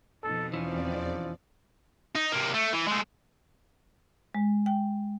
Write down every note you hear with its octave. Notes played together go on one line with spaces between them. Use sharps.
F2 B2 D#4 A4
E2 E3 F3 C4 C#4 D5
D#4
C3 A#3
A3
E3
G#3 A3
G#3
G5